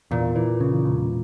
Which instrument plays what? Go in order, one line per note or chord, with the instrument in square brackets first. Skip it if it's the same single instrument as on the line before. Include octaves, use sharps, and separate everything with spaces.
[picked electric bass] E2 [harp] A#2
[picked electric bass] E3
C#3
E1